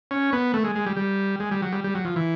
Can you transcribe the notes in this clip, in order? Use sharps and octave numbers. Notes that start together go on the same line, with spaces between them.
C#4
B3
A3
G#3
G#3
G3
G3
G#3
G3
F#3
G3
G3
F#3
F3
E3